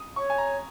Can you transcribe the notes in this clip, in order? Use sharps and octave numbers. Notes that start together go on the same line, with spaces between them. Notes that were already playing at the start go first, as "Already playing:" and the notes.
Already playing: D#6
C#5 C#6
G#5
A#5